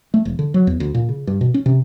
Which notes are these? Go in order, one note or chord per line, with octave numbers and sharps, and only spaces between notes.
A3
E1
D3
F#3
E2
D2
A#2
C#3
G2
B2
C#4
C3